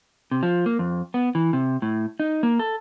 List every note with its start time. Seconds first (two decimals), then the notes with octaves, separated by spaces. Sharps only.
0.31 C3
0.43 F3
0.66 A#3
0.79 F2
1.14 B3
1.35 E3
1.53 C3
1.82 A2
2.20 D#4
2.43 A#3
2.59 A4